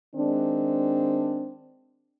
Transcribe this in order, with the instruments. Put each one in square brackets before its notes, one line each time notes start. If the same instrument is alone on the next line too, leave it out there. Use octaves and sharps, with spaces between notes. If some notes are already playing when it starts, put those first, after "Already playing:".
[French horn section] D#3 G#3 C4 D4